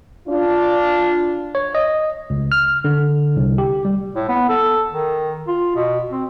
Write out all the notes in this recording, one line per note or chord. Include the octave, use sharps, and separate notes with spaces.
D4 F4
C#5
D#5
C#2
F6
D3
C2
G4
G3
A2
B3
A4
D#3
F4
B2
C4